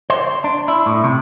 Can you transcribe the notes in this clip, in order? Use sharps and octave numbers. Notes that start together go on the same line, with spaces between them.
C5
D4
E4
A2
C3